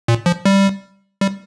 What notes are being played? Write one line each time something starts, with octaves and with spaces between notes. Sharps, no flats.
A#2
F3
G3
G3